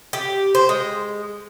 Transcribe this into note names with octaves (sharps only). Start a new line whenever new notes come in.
G4
C5
G#3